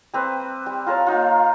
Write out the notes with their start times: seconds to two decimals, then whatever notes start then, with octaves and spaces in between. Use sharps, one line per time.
0.14 G3 C4 B4
0.66 G3
0.86 F4 A#4 C#5 A5
1.07 A#3 D#4 F4